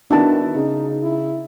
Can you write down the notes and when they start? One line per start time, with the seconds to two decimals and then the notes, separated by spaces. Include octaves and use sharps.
0.11 D#3 B3 D4 E4 F#4 A5
0.55 C#3 D#4
1.03 E4